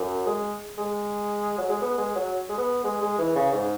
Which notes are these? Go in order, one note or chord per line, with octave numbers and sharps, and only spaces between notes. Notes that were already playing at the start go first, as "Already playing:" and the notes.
Already playing: F#2
G#3
G#3
F#3
G#3
B3
G#3
F#3
G#3
B3
G#3
G#3
E3
C#3
G#2